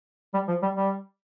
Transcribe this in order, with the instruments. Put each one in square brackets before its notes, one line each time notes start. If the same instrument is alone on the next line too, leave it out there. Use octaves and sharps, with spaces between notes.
[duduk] G3
F3
G3
G3